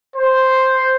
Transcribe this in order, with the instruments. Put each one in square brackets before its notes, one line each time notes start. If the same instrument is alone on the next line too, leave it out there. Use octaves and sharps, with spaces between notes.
[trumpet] C5